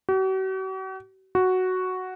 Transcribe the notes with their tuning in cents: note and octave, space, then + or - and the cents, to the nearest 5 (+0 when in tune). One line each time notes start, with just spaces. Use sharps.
F#4 +45
F#4 +0